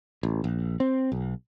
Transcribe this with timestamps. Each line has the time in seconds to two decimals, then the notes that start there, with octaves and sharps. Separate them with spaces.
0.23 A1
0.44 A#1
0.80 C4
1.12 B1